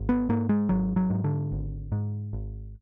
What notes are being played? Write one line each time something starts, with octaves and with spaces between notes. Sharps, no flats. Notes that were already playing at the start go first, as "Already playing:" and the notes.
Already playing: G#1
B3
G#2 A#3
G#3
G#1 F#3
F#3
G#2
D3
G#1
G#2
G#1